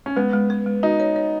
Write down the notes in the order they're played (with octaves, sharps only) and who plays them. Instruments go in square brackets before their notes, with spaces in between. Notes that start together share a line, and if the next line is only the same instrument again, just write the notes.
[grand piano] C#4
[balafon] G#3 [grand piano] B3
[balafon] G#3
B4
G#3
[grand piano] D#4 [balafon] F#4
[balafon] C#5
C#5